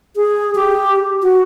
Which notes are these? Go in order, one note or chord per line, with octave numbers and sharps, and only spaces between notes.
G#4
G4
F#4